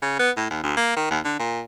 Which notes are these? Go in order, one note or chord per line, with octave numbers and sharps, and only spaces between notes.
C#3
B3
A2
D#2
D2
A#3
D#3
D#2
D3
A#2